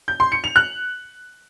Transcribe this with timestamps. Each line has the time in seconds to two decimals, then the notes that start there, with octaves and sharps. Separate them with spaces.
0.08 G6
0.20 C6
0.32 C#7
0.44 F7
0.56 F#6